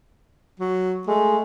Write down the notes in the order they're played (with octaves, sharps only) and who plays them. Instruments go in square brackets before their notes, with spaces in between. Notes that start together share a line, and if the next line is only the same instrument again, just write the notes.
[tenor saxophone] F#3
[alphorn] G#3 [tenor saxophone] A3